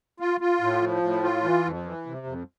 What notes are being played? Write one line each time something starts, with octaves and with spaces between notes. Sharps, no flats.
F4
F4
A2
F3
A2
F4
E3
F2
E3
C3
F2